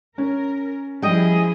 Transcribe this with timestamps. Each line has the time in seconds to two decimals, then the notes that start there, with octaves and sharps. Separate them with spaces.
0.18 C#4 A#4
1.02 F3 G3 E4 G#4 D#5 G5